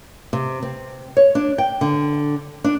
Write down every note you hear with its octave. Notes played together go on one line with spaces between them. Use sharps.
C3
C4
C#5
D4
G5
D3
D4